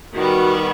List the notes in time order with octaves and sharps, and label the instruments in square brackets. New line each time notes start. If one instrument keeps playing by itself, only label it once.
[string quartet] D#3 G3 B3 [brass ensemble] F#4